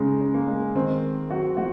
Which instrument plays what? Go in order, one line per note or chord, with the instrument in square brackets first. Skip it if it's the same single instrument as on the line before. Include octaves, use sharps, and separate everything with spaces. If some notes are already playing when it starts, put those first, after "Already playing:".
Already playing: [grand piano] C#3 D#4 [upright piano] G#3
[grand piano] C#4
[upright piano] A#3
[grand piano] G#3
[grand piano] D#3 [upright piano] C4
[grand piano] A#3
[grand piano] F#3 [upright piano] F#4
[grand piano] F3 [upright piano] F#4